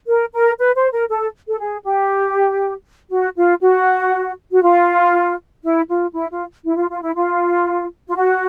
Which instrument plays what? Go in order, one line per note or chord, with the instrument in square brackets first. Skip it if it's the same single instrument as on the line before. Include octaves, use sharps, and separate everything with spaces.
[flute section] A#4
A#4
B4
C5
A#4
A4
A4
G#4
G4
F#4
F4
F#4
F#4
F4
E4
F4
E4
F4
E4
F4
F4
E4
F4
F4
F#4